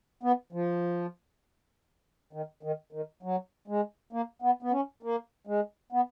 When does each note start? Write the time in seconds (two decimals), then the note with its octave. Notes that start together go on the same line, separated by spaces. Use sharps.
0.23 B3
0.52 F3
2.33 D#3
2.63 D#3
2.93 D#3
3.23 F#3
3.68 G#3
4.13 A#3
4.42 B3
4.62 B3
4.72 C#4
5.03 A#3
5.47 G#3
5.92 B3